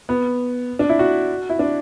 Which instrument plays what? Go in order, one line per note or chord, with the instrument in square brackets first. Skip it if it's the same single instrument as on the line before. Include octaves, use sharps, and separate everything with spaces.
[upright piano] B3
D4
E4
F#4
E4
D4